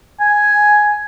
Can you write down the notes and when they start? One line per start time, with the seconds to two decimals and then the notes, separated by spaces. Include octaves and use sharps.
0.20 G#5